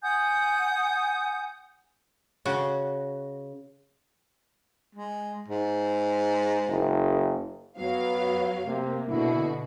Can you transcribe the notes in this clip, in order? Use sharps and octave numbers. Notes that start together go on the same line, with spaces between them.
F#5 G#5 D#6 G6
C#3 F#4
G#3
G#2
F#1
F#2 F#3 B3 F5
C3 A#3
B2 D3 E4 F#4